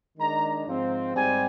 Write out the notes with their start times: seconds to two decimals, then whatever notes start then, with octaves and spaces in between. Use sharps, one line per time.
0.18 D#3 G#3 D4 A#5
0.67 G#2 F3 C4
1.14 G#2 G3 C4 G#5